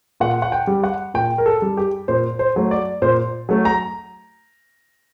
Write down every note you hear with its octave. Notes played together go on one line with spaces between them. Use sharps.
A#2 F#5
F#5
G5
G3
F#5
A#2 G5
A#4
A4
G3
G4
A#2 C5
C5
F#3 A3
D5
A#2 C5
F#3 A3
A#5